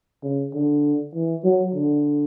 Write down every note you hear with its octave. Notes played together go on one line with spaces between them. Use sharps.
C#3
D3
E3
F#3
D3